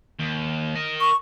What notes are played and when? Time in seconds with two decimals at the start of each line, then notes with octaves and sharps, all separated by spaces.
0.19 D#2
0.75 A#4 D#5
1.00 C#6